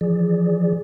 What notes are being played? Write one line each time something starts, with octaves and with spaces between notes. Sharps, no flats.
E3 F3 G#4 D5